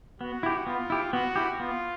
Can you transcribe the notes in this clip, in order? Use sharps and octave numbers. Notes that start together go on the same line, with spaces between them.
B3 F#4
E4 G4
B3 F4
E4 G4
B3 F#4
E4 G4
B3 F4